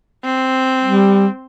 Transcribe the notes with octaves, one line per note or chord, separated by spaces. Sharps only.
C4
G3